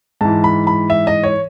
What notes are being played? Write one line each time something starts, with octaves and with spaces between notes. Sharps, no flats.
G#2 E3 A5
B5
B5
E5
D#5
C#5